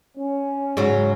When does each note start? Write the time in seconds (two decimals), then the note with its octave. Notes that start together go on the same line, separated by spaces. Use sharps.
0.18 C#4
0.77 G#2 C#3 F#3